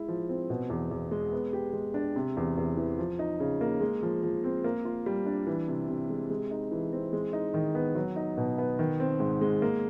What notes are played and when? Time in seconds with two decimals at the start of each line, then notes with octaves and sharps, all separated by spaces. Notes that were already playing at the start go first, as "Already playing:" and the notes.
Already playing: G#3 E4
0.08 F3
0.29 C4
0.50 B2
0.70 E2
0.91 E2
1.11 G#3
1.33 B3
1.53 G4
1.73 G#3
1.94 D4
2.16 C3
2.37 E2
2.57 E2
2.77 E3
2.99 F3
3.19 D#4
3.40 C#3
3.61 A#3
3.81 G#3
4.03 F3
4.23 F3
4.44 C4
4.64 A#3
4.85 F4
5.06 G3
5.26 D4
5.47 E3
5.68 C3
5.88 C3
6.10 G#3
6.30 G#3
6.51 D#4
6.71 E3
6.93 C4
7.13 G#3
7.33 D#4
7.54 D#3
7.75 B3
7.95 F#3
8.16 D#4
8.37 B2
8.58 B3
8.79 D#3
9.00 C4
9.20 G#2
9.41 G#3
9.62 A#3